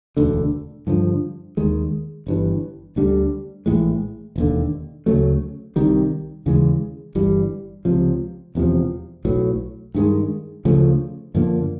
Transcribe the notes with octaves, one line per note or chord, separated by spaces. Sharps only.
E1 D2 D3
G2 D3 F3
D#2 D#3 G#3
G1 G2 E3
D2 D3 G3
A#1 A2 E3 G#3
E1 D#2 D3
D2 C#3 F#3 A3
C2 C3 D#3 G3
D#2 C#3 E3 G#3
G1 G2 E3 G3
C#2 C3 F3
E1 E2 C3 F3
B1 A2 F#3
G2 D#3 G#3
D2 C#3 F3 A3
F#2 D3 F3 A#3